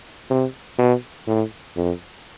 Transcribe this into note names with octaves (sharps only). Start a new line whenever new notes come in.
C3
B2
A2
F2